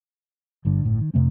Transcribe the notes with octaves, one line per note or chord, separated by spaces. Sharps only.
G1 G2 D3
G1 A2
D#3
F2 C3 A3 C4